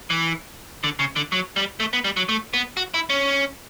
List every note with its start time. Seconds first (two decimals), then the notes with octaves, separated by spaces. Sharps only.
0.10 E3
0.84 D3
0.99 C#3
1.16 D3
1.32 F#3
1.56 G3
1.80 A3
1.93 B3
2.04 G3
2.17 F#3
2.29 A3
2.54 B3
2.77 F#4
2.94 E4
3.10 C#4